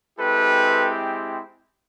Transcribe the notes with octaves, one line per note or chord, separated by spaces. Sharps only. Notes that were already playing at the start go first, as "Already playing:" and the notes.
G#3 C4 E4 G4 A4 B4